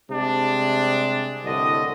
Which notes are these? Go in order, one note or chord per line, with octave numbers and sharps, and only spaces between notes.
C3 G3 G#3 D4
C2 A2 D3 D#5